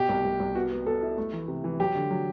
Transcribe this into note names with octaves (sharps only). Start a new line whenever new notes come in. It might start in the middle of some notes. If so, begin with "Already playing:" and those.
Already playing: B2 G4
C2
C2
C2
B3 F#4
B3
B3 A4
E4
A3
E3
C3
E3
F#3 G4
D3
F#3